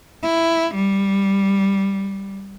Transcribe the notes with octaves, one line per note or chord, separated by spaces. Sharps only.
E4
G3